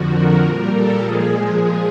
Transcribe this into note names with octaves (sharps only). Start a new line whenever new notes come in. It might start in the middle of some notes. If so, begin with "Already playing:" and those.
Already playing: F2 D3 F3 F#4
A#4
A#2 G3 A#4
A4
A#2 F3 G#3 G#4